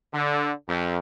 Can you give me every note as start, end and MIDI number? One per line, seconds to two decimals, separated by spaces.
0.14 0.51 50
0.68 0.98 41